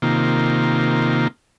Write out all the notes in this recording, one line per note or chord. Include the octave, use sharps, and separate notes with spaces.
C3 D#3 A#3 F4